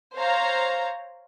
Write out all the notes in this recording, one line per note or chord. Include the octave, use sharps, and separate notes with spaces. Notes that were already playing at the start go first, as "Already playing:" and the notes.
C5 C#5 F5 A#5